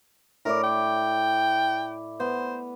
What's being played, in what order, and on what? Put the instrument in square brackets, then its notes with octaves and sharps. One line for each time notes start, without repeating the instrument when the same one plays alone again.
[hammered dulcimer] A2 E4 D5 [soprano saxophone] A#4
[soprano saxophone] G5
[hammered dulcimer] B3 [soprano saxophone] C5